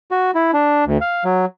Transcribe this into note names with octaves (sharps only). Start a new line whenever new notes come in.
F#4
E4
D4
D2
F5
F#3